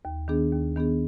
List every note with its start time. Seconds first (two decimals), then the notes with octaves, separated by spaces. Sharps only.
0.05 D#2
0.28 D#3 B3 D4 G#4
0.52 D#2
0.76 D#3 B3 D4 G#4